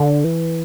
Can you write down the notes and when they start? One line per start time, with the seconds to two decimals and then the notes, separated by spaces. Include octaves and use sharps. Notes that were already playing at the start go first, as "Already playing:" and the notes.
Already playing: D3
0.24 E3